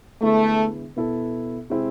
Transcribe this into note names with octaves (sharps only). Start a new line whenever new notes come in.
D3 G#3 A3 B3 E4
B2 B3 E4 A4
C3 G#3 C4 E4